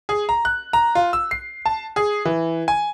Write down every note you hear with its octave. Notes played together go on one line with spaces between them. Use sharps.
G#4
A#5
F#6
A#5
F4
E6
C7
A5
G#4
E3
G#5